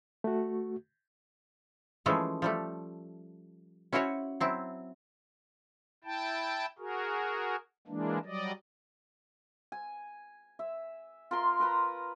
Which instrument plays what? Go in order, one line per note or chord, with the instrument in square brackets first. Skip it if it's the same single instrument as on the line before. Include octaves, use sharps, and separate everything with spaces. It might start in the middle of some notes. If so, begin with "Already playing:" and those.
[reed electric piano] A3 F#4
[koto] E3 F3 G#3 A3 C#4
F3 G3 A3
C#4 E4 F#4 C5 C#5
F#3 C4 E4
[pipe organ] E4 G5 A5
F#4 G#4 A#4
E3 G#3 A#3 D4
F#3 G3 D5 D#5
[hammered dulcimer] G#5
E5
F4 A#4 C6
A#4 B4 A#5 B5